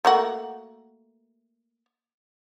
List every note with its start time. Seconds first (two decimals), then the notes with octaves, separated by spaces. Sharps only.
0.05 A3 A#3 F#4